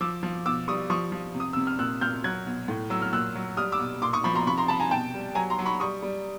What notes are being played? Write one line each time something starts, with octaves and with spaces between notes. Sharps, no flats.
F3 D6 E6
F3
B2 D6 E6
G3 C#6 D#6
F3 C#6 D#6
F3
C3
D#6
C3 E6
F6
A#2 E6 F#6
A#2 F6 G6
F#3 F#6 G#6
B2
A2
F#3 E6
F6
A#2 E6 F#6
F#3
G3 D#6 F6
D6 E6
B2
A#2 C6 D6
C#6 D#6
F3 B5 C#6
A#5 C6
C3 B5 C#6
A#5 C6
C3 A5 B5
G#5 A#5
B2 G5 A5
G3
F#3 G#5 A#5
A#5 C6
F#3
B5 C#6
G3 C#6 D#6
G3